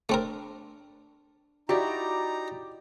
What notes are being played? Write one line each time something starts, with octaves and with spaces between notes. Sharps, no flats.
A3 C4 D4 A#4
D#4 E4 F#4 G4 D5 A#5